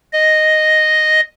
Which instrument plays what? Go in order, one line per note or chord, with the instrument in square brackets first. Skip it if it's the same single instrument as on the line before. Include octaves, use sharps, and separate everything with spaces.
[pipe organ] D#5